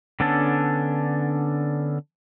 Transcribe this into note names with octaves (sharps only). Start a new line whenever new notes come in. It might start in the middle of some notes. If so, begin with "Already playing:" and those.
D3 B3 C#4 D4 A4